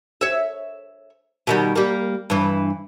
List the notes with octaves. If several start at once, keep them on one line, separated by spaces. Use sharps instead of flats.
C#5 E5
B2 D#3 G3
G3 A#3
G2 E3